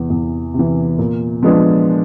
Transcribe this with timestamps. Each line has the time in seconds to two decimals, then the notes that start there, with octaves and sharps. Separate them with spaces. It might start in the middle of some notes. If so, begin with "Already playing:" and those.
Already playing: E2 C3 E3
0.10 E2
0.54 C3 E3
0.98 A#2
1.43 F3 G#3 B3 D4